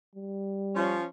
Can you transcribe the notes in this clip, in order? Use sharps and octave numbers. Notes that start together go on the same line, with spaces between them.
G3
F3 C#4